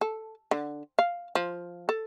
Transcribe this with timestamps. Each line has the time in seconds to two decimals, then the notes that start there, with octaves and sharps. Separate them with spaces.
0.01 A4
0.51 D3
0.99 F5
1.35 F3
1.89 A4